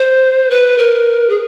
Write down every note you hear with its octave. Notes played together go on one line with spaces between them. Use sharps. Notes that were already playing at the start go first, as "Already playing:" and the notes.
Already playing: C5
B4
A#4
G#4